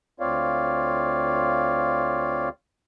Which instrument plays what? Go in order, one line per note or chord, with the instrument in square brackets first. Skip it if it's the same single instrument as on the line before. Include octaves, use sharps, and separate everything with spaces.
[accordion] D2 C4 F4 C#5 D5 F5